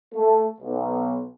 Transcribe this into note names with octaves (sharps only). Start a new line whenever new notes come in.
A3
B1